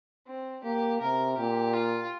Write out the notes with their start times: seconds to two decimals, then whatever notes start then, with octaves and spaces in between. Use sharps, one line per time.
0.27 C4
0.64 A#3 G4
1.01 C3 A#4
1.37 A#2 G4
1.74 F4